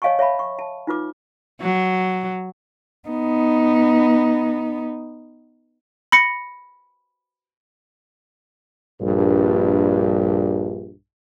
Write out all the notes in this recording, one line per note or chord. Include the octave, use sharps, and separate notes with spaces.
C#5 D#5 F5 G#5 A5 C#6
C#5 E5 F5 A5 B5
C#6
A5
D#4 F4 B4 D6
F#3
B3 D#4
B5 A#6 C#7
A#1 G2